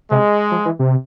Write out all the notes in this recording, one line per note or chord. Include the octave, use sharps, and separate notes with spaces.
C3 G#3
F3
E3
C3